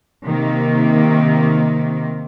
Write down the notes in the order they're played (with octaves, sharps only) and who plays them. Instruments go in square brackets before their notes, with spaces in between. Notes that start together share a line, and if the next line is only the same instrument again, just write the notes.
[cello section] C3 D#3 A#3